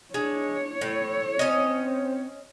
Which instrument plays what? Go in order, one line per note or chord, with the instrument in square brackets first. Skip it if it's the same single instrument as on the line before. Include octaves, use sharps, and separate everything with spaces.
[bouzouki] G#3 [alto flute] D4 [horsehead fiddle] C#5
[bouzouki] A2 [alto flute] A4
[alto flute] C4 [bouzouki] C#4 D#5